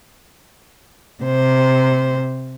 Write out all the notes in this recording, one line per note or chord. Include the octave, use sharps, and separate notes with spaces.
C3 C5